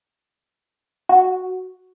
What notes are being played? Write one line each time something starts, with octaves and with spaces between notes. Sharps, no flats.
F#4